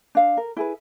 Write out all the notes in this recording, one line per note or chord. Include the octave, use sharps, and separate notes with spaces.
D4 F5
A#4
E4 G#4 B4